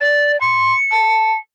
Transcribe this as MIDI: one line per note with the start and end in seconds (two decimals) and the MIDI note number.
0.01 0.39 74
0.01 0.32 93
0.41 0.73 84
0.41 1.38 97
0.91 1.34 81